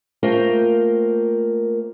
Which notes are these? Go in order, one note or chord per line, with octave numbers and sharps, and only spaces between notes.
A3 A#3 F4 A#4 C5 G5